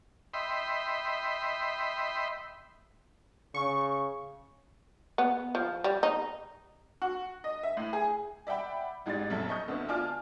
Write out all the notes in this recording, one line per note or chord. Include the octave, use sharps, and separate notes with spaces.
D#5 E5 G5 B5 C6
C#3 C#6
B3
F3
G3
D#4
F#4
D#5
E5
A2
G#4
D5 E5 F#5 G5 B5
A1 G#2 G4 D5 A6
A#1 F#2 A4 E5 A5
D#5 E5 C#6 D#6 G6
D2 D3 B3 D#6
F4 D5 G#5 A5 D6 F6